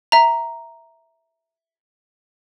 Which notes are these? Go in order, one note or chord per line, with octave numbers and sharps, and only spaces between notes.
E5 A#5